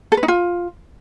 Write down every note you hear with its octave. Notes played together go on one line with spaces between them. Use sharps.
A4
B4
D#4
F4